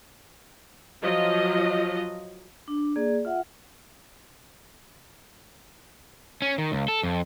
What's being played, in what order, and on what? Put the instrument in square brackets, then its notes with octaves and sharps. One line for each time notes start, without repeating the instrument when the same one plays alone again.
[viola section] F3 F#3 F4 D#5
[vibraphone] D4
A#3 G#4 D5
F4 E5 F#5
[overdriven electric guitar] C#4
D#3
C#2
A4
F2